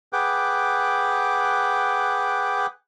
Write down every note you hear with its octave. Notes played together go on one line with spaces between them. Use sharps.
G#4 B4 F#5 G5 D6